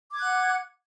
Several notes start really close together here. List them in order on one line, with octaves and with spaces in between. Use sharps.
D6 G#6 F#6 F#5